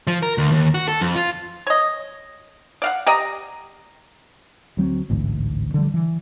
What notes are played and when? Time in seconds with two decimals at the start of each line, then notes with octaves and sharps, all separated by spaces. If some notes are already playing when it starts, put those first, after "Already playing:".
0.07 F3
0.23 A#4
0.38 D2
0.52 D#2
0.74 F#4
0.88 A4
1.01 F2
1.15 F4
1.67 C#5 D#5
2.82 D5 F5 F#5
3.06 G4 D5 D#5 A#5
4.77 D2 F#3 G#3 C4
5.10 A1 D2 G#2
5.74 D3 F3 G3
5.94 E3